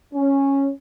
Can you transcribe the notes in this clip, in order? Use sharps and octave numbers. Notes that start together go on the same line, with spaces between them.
C#4